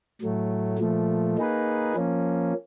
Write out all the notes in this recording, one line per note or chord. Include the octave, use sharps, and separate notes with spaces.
A2 F#3 A3
A#2 F3 A3
A#3 D#4 G#4 B4
F3 A#3 C#4